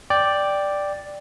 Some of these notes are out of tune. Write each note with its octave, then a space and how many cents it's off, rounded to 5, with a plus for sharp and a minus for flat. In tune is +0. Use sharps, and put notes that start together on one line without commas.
D5 +0 G5 +0